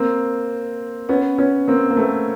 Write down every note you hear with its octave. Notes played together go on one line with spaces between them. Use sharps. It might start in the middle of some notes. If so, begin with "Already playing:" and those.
Already playing: A#3 C4
B3 C#4
B3 C#4
A#3 C4
A#3
A3 B3